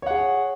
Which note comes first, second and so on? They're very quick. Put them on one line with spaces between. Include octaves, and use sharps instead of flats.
C#5 F#5 G#4